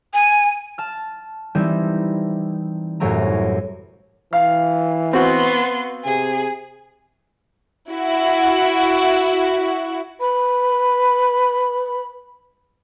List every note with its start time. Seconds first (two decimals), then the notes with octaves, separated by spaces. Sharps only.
0.14 G#5
0.78 A5 F6
1.55 E3 G3 C4 D#4 E4
3.00 C2 F#2 A2 E3 A3 A#5
4.33 E3 F5
5.13 B3 C4 F#4 C6
6.05 C3 G#4
7.90 E4 F#4
10.20 B4 B5